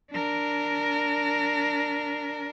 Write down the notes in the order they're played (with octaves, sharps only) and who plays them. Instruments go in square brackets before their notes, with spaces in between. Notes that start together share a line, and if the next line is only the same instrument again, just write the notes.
[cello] D4 A#4